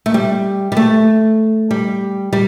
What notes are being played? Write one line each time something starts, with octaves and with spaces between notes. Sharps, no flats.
A3
G3
G3
A3
G3
G3